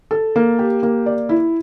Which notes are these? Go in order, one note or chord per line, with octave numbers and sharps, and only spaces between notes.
A4
A#3
G4
A#3
D5
E4